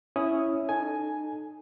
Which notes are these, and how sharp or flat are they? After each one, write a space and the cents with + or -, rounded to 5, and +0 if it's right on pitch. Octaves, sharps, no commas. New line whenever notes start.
C#4 +0 E4 +0 D#6 +0
D#4 -30 A4 +0 G#5 +5